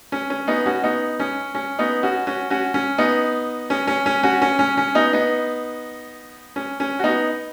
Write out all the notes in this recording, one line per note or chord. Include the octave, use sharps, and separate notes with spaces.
C#4
C#4
B3 D#4
C#4 F#4
B3 D#4
C#4
C#4
B3 D#4
C#4 F#4
C#4 F#4
C#4 F#4
C#4
B3 D#4
C#4
C#4
C#4
C#4 F#4
C#4
C#4
C#4
B3 D#4
B3 D#4
C#4
C#4
F#4
B3 D#4